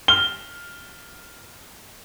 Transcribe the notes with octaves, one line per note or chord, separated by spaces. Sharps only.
F6 G7